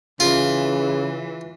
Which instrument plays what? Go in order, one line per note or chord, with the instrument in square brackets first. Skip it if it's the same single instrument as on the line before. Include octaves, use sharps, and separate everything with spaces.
[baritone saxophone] C#3 [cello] E3 [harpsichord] F4